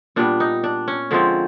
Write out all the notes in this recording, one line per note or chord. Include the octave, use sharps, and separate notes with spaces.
A#2 G3 B3 D4
D#4
D4
C#4
D3 F3 G#3 C4